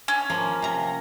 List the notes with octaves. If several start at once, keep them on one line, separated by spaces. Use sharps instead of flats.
C#4
F3 A#3
C3 A#5